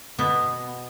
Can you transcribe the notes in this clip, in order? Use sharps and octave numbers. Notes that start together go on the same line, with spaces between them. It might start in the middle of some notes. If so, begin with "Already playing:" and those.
B2 B3